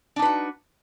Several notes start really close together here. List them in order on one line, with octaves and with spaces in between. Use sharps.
D4 D#4 B4 F#4